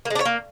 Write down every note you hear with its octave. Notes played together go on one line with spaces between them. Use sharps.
A#3
G#3
D4
C#5
A#3